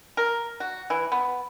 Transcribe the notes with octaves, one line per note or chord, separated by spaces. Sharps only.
A#4
F#4
E3
B3